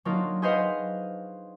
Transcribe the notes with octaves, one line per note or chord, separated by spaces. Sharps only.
F#3 A#3 D4 D#4 F4
G#4 B4 C5 D#5 F5 F#5